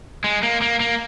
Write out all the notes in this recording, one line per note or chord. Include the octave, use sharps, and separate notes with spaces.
G#3
A#3
A#3
A#3